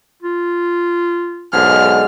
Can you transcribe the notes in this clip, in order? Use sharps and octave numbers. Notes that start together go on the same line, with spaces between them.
F4
B1 G#2 D3 G#4 F6